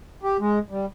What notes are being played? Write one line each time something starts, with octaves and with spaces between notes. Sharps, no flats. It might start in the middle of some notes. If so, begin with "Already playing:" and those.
G4
G#3
G3